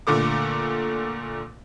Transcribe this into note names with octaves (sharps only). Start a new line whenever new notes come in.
A#2 D3 A3 D6